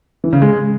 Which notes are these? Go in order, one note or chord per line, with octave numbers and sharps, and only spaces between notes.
E3
C#3
G#3